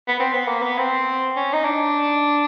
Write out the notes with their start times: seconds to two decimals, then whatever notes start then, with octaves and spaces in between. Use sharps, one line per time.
0.08 B3
0.19 C4
0.33 B3
0.48 A#3
0.62 B3
0.78 C4
1.36 C#4
1.53 D#4
1.65 D4